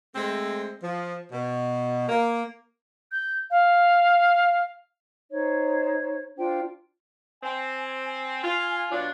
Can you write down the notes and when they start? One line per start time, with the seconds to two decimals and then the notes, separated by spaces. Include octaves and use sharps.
0.15 G#3 A3 C4
0.82 F3
1.31 B2
2.08 A#3
3.12 G6
3.51 F5
5.30 D#4 C5 C#5
6.38 D4 F4 C5 G5
7.43 C4 G#5
8.04 G#5
8.43 F4
8.91 B2 F#3 D4 F4